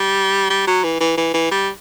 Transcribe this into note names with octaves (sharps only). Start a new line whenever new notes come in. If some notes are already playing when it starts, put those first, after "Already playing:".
Already playing: G3
G3
F#3
E3
E3
E3
E3
G3